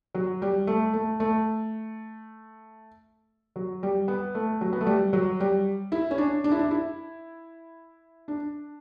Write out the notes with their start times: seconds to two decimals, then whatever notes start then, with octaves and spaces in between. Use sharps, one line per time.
0.14 F#3
0.42 G3
0.67 A3
0.93 A3
1.20 A3
3.56 F#3
3.83 G3
4.08 B3
4.35 A3
4.61 F#3
4.73 B3
4.81 A3
4.87 G3
5.13 F#3
5.40 G3
5.92 E4
6.11 C#4
6.18 D4
6.44 D4
6.51 E4
6.59 D4
6.71 E4
8.28 D4